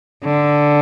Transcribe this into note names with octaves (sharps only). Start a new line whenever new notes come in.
D3